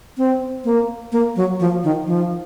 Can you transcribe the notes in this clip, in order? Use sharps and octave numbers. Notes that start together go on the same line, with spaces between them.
C4
A#3
A#3
F#3
F3
D#3
F3